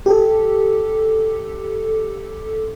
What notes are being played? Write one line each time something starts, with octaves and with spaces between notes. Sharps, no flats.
G4 A4